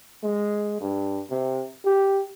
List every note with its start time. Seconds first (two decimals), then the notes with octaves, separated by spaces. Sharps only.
0.23 G#3
0.81 G2
1.30 C3
1.85 G4